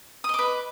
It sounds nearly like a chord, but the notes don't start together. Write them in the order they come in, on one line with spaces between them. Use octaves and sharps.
D#6 D#5 D6 B4